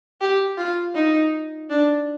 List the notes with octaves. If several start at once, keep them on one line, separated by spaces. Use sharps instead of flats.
G4
F4
D#4
D4